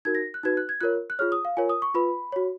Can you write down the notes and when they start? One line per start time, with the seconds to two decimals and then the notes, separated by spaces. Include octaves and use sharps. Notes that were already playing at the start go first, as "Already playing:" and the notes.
0.05 D#4 F#4 A#4 G#6
0.15 A#6
0.34 F#6
0.43 D#4 F#4 B4 G#6
0.57 F#6
0.69 G#6
0.81 F4 A#4 C#5 F#6
1.10 F#6
1.19 F4 G#4 C#5 F6
1.32 D#6
1.45 F5
1.57 F4 A#4 C#5 G#5
1.69 D#6
1.82 C#6
1.94 F4 B4 B5
2.32 F#4 C#5